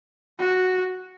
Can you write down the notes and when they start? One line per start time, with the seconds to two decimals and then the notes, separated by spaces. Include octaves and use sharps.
0.39 F#4